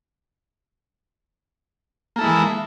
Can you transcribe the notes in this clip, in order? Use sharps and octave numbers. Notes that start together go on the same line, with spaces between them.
E3 G#3 A#3 E4 A4